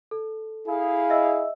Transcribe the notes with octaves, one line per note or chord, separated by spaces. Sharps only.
A4
E4 G#4 F5
D#5 E5 E6